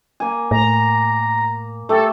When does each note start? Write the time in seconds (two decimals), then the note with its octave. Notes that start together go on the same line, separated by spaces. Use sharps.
0.20 A#3 G#5
0.51 A2 A#5
1.89 A3 G4 A4